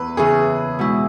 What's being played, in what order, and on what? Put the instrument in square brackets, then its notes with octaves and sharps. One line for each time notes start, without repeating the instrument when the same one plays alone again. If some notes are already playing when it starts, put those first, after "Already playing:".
Already playing: [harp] E2 E4 [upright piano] B4
[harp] C#3 E3 C#4 [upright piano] G#4
[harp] B2 G#3 E4